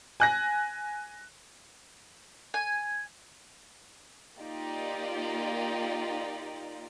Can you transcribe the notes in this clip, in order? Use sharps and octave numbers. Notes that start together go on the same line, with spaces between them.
G#5 F#6 A#6
G#5
A#3 D#4 F4 G4 D5